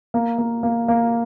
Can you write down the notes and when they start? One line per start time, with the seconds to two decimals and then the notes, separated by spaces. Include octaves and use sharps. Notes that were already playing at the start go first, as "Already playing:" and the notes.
0.14 A#3
0.38 A#3
0.63 A#3
0.88 A#3